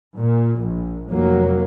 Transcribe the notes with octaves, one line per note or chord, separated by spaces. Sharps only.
A#2
A#1
F1 F#3 A#3